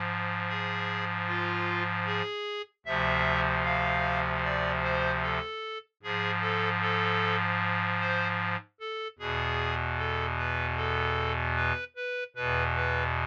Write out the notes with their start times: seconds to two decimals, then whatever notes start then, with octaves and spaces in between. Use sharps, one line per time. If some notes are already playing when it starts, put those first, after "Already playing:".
Already playing: G#2 F3
0.49 G#4
1.27 F4
2.06 G#4
2.86 D2 C3 F3 E5
3.64 F5
4.44 D5
4.84 C5
5.23 A4
6.03 G#2 F3 G#4
6.42 A4
6.81 A4
8.00 C5
8.80 A4
9.19 E2 B2 G#4
9.98 A4
10.38 B4
10.77 A4
11.56 B4
11.96 B4
12.36 E2 B2 B4
12.76 B4